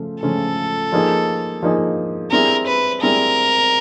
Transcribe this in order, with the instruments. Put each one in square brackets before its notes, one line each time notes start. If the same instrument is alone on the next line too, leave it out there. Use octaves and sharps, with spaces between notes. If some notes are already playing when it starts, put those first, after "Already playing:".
Already playing: [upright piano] C#3 F3 A3 C#4 F4
[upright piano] C#3 F3 A3 C#4 F4 [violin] A4
[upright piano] F3 A#3 D#4 G#4
F3 A#3 D#4 G#4
[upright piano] G3 C4 E4 G#4 [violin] A#4
[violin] B4
[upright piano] G3 C4 E4 G#4 [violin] A#4